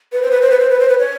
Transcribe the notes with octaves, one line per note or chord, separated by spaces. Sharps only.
B4
C5
B4
C5
B4
C5
B4
C5
B4
C#5